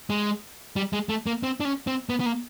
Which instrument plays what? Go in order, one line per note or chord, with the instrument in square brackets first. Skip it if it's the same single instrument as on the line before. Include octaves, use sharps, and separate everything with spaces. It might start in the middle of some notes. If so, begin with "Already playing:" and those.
[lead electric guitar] G#3
G3
G#3
A3
A#3
C4
D4
C#4
C4
B3
B3
A#3